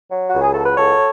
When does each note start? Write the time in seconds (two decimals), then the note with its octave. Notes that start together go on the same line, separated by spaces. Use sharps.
0.11 F#3
0.30 C#2 F#4
0.41 G#4
0.54 F#3 A4
0.65 B4
0.77 C#2 A4 C#5